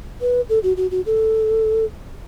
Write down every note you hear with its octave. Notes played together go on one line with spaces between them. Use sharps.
B4
A4
F#4
F#4
F#4
A4